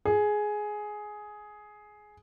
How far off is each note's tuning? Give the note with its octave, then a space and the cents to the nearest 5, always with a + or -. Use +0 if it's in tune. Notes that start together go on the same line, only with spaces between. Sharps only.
G#4 +10